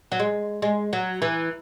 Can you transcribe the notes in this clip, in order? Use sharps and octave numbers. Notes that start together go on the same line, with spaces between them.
F#3
G#3
G#3
F#3
E3